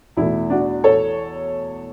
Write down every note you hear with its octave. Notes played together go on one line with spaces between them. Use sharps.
E2 B2 A3 E4
D4 F#4
A4 C#5